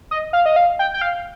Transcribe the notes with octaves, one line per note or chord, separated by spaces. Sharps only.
D#5
F5
D#5
F5
G5
G5
F5